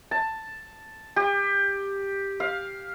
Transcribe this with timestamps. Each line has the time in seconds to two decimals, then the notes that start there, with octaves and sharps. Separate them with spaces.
0.11 A5
1.16 G4
2.40 F5